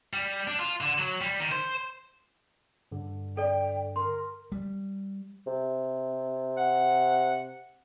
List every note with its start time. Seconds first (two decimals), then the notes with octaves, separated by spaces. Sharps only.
0.13 G3
0.47 D4
0.60 F4
0.81 D3
0.98 F#3
1.21 G3
1.40 D#3
1.51 C5
2.92 G2 D3
3.37 A4 D5 G5
3.96 A#4 C6
4.52 G3
5.47 C3
6.57 F#5